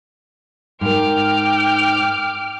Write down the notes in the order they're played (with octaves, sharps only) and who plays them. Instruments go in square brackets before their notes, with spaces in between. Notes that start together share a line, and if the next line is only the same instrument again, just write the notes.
[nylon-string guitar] G#2 A#4 [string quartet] G5 D6 F6